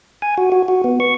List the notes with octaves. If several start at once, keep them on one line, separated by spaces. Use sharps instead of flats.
G#5
F#4
F#4
F#4
B3
C#6